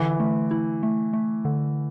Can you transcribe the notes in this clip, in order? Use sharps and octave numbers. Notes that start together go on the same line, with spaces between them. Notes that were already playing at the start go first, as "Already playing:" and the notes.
Already playing: D3 E3
A3
E4
A3
A3
D3